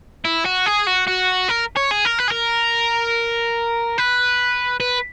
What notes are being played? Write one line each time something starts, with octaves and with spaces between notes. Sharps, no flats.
E4
F#4
G#4
F#4
F#4
A#4
C#5
G#4
A#4
B4
G#4
A#4
B4
B4